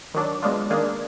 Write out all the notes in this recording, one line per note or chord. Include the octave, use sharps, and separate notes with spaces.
D#3 F#3 D4
B2 G#3 D4 F4
D#3 A#3 D4 G#4